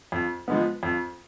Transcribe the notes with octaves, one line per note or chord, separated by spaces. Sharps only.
F2
F3 G#3 B3
F2